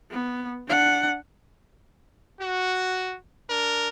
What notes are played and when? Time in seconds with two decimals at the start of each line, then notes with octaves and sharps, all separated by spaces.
0.11 B3
0.68 D4 F#5
2.40 F#4
3.49 D4 A#4